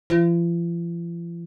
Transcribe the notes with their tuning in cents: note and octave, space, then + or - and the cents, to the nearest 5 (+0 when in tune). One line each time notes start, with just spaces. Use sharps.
F3 -45